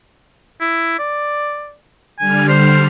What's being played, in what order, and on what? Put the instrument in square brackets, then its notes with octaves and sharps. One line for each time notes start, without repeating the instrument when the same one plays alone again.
[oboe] E4
D5
[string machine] D3 G3 F6 [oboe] G#5
[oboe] C5